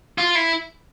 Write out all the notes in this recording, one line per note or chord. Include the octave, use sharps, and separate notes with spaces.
F4
E4